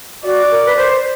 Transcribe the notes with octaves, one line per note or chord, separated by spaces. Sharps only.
F#4 D5
A#4
B4
C5